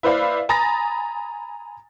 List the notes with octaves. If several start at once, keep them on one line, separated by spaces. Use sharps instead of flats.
E4 B4 C5 D5 F5 B5
G#5 A#5 B5 D#6 A6 A#6